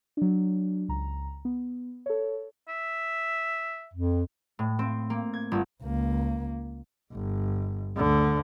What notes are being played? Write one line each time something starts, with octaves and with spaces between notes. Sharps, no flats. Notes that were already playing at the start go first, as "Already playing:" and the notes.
F#3 D4
C#2 A#5
B3
A4 C#5
E5
F2
A2
C4
A#3
G#6
G1
C#2 A#3
G1
D2 D3